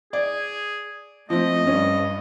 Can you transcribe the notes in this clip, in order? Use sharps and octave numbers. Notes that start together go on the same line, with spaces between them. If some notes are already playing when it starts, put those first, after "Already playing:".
G#4 D5
F3 A3 C4 D#5
G2 C#4